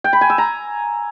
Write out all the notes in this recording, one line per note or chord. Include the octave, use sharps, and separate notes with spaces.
G5
B5
G#5
E6
A#5